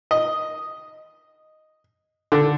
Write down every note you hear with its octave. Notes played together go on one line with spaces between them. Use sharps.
D#5
D3